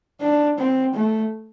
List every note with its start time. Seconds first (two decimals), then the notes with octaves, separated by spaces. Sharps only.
0.21 D4
0.59 C4
0.94 A3